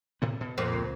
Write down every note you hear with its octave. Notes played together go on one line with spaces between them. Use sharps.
A2 C3 B3
B2
F2 A#2
C#2